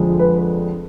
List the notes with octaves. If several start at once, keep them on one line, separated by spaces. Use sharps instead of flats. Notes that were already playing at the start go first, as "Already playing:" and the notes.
Already playing: F2 D3 F3 G#3
B4